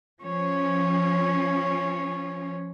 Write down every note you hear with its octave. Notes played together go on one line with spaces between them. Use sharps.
F3 C#4 C#5